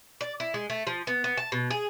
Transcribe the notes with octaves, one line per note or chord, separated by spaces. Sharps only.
D5
E4
G#3
A3
F3
B3
B3
A5
B2
G#4